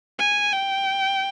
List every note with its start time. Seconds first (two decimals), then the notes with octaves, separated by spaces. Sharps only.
0.19 G#5
0.53 G5